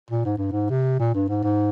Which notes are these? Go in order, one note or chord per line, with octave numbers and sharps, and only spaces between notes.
A#2
G#2
G2
G#2
C3
A#2
G2
G#2
G#2